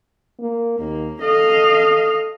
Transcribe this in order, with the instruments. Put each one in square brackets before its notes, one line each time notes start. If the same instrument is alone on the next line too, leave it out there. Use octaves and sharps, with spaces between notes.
[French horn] A#3
[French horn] D#2 [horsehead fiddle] A#3
[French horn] A4 [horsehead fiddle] D#5 F5